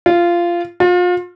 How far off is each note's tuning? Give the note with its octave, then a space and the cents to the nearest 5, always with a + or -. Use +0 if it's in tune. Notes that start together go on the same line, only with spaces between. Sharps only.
F4 -15
F4 +35